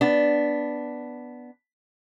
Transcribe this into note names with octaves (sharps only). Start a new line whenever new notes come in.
B3 D4